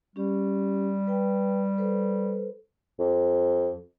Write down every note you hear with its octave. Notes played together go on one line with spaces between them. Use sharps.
G3 C#4 G4
B4 G5
A4 B4 C5
F2